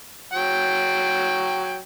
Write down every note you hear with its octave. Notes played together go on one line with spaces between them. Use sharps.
F#3 G5